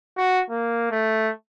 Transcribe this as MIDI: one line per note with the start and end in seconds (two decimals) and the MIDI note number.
0.17 0.41 66
0.50 0.88 58
0.91 1.31 57